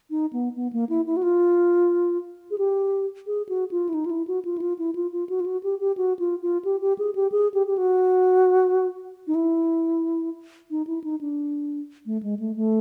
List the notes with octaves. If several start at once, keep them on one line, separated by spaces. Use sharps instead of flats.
D#4
B3
B3
A#3
E4
E4
F#4
F4
G#4
G4
G#4
F#4
F4
E4
D#4
F4
E4
F#4
F4
E4
F4
E4
F4
F4
F#4
F4
F#4
G4
G4
F#4
F4
F4
G4
G4
G#4
G4
G#4
G4
G4
F#4
D#4
E4
D#4
E4
D#4
D4
A3
G#3
A3
A3